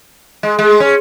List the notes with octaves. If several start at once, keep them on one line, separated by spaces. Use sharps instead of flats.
G#3
G#3
C#4